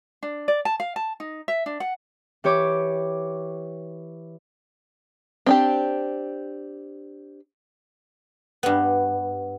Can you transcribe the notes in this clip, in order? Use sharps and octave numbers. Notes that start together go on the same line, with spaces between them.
D4
D5
A5
F5
A5
D#4
E5
D4
F#5
E3 G4 C#5 D6
C4 D4 G4
G2 B3